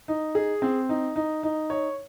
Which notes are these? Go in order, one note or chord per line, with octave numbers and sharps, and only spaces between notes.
D#4
G#4
C4
D#4
D#4
D#4
C#5